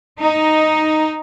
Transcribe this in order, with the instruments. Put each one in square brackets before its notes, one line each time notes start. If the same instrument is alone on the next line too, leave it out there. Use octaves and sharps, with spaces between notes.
[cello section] D#4